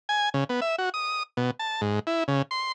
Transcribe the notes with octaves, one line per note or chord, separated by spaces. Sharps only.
G#5
C#3
B3
E5
F#4
D#6
B2
A5
G#2
E4
C#3
C6